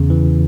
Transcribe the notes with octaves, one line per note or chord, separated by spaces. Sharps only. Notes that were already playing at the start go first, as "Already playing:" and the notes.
Already playing: E2 C#3
E3